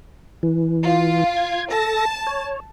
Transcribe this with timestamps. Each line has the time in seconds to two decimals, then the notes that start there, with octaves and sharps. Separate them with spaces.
0.43 E3
0.84 F4
1.37 G#6
1.71 A4 A5 A#6
2.27 C#5